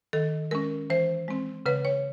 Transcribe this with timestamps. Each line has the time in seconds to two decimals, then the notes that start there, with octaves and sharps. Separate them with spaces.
0.13 D#3 A4
0.51 G#3 C#4 A#4
0.90 E3 C5
1.28 G#3 C4
1.66 C#3 B4
1.85 C#5